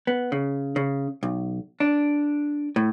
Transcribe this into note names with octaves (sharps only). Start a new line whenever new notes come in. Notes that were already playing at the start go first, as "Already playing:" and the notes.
B3
C#3
C#3
B1
D4
A2